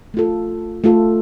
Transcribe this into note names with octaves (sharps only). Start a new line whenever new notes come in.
A3 F4 A4
A3 F4 A4